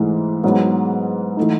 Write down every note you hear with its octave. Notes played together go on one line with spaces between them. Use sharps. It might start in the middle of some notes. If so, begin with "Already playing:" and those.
Already playing: G#2 E3 A3
G#2 F#3 B3
E3 A3 D#4